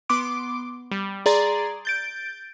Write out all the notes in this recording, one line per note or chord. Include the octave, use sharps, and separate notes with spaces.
B3 C6 D6 D7
G3
G#4 D5 A#5 C6 A6
G6 A6 D7